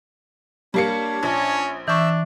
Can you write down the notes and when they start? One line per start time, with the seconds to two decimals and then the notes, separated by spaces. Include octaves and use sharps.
0.74 G3 A#3 D4 C#5 C#7
1.23 A#1 C#4
1.88 E3 D4 E5 C#6 E6